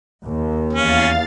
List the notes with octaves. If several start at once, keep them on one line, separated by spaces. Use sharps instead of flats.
D#2
E2 C#4 F5 A6